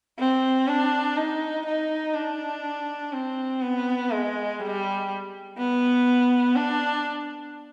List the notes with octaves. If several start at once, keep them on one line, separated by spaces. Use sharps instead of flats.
C4
D4
D#4
D#4
D4
C4
B3
G#3
G3
B3
D4